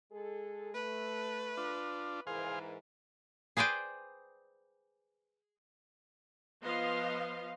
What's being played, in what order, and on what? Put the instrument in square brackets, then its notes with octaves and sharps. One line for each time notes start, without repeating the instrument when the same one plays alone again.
[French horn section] G#3 G#4 A4
[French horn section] A3 [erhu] B4
[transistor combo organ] D4 F4
[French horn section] G#2 E3 A#4 [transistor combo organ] G#4 C5 F5
[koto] G#4 B4 C5 D5 G5
[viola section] F3 B3 D#5 F5 C6